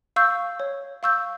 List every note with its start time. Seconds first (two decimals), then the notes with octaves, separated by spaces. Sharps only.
0.16 F5 C#6 E6 G6
0.60 C#5
1.03 F5 C#6 E6 G6